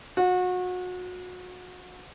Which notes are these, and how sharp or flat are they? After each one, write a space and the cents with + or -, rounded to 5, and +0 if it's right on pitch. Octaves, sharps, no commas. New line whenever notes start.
F#4 -30